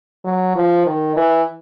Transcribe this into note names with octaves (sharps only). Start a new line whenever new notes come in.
F#3
F3
D#3
E3